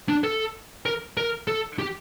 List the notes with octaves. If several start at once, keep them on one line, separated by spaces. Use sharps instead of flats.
D4
A4
A#4
A#4
A4
G4